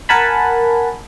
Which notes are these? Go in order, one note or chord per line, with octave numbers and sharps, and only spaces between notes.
A#4 F#5 G#5 A5 B5